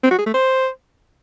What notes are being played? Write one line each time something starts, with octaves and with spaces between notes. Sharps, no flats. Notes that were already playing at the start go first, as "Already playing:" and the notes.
C4
F#4
G#4
A3
C5